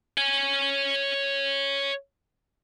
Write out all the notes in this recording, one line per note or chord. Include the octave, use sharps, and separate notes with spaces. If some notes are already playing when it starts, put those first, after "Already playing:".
C#5 G#5